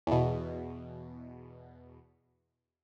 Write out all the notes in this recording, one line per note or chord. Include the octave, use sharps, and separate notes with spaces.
E2 B2